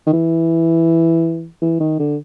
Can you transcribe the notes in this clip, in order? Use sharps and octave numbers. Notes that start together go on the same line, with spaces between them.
D#3
E3
E3
D#3
D3